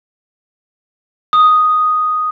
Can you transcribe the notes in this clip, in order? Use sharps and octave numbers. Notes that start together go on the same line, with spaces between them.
D#6